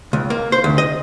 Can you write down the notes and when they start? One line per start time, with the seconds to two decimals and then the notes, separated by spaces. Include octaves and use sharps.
0.13 C#2
0.30 A#3
0.52 C5
0.64 D2
0.78 D#5